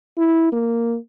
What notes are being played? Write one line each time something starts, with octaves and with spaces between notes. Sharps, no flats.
E4
A#3